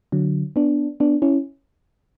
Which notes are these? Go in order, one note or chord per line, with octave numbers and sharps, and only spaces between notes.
D3 F#3
B3 D4
B3 D4
C#4 E4